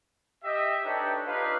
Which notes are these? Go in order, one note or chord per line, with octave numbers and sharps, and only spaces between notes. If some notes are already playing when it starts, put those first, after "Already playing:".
G4 D#5 E5
D4 D#4 G4 A4 B4 C#5
D4 D#4 F4 G4 B4 F5